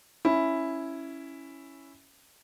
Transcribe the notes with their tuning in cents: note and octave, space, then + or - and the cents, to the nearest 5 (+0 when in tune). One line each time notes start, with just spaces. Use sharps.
C#4 +0 E4 +0